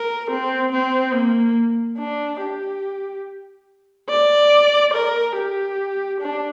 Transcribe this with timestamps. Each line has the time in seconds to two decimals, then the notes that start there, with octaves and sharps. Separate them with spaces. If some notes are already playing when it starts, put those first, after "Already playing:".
Already playing: A#4
0.30 C4
0.72 C4
1.14 A#3
1.99 D4
2.41 G4
4.09 D5
4.94 A#4
5.36 G4
6.21 D4